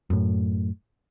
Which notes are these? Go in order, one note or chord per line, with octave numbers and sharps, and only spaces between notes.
F#2 A2